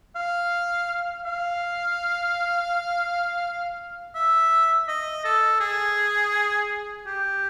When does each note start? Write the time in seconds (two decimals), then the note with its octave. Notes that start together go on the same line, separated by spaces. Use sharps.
0.15 F5
1.25 F5
4.15 E5
4.88 D#5
5.24 A4
5.60 G#4
7.06 G4